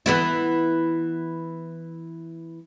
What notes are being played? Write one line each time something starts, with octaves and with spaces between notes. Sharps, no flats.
E3 B3 E4